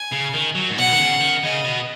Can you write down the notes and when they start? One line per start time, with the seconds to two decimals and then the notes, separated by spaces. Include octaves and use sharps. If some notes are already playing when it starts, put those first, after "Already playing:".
Already playing: G#5
0.13 C#3
0.34 D#3
0.56 F#3
0.71 G#2
0.77 B2 F#5
0.92 D#3
0.99 C#3
1.21 D#3
1.43 C#3 D#5
1.64 B2